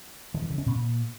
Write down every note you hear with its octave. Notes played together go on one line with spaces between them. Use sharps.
D#3
E3
C#3
C#4
A#2